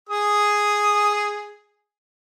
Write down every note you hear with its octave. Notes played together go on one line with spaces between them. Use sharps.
G#4 D#6